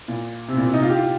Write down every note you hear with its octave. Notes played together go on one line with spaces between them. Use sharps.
A#2
C3
A#2
C3
D#4
F4
G4
F4